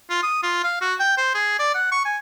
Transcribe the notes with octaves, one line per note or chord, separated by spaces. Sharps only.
F4
D#6
F4
F5
F#4
G5
C5
G#4
D5
F#5
C#6
G#5